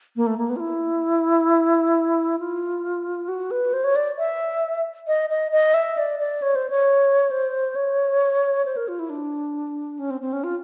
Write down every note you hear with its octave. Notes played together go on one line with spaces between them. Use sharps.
A#3
A3
A#3
B3
F4
E4
F4
F#4
B4
C5
C#5
D5
E5
D#5
D#5
D#5
E5
D5
D5
C#5
C5
C#5
C5
C#5
C5
A#4
F4
E4
D4
C#4
C4
C4
C#4
F4